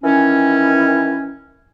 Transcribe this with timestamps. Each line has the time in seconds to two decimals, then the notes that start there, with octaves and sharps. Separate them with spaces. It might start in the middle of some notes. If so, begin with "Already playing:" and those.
0.03 D#3 E3 C#4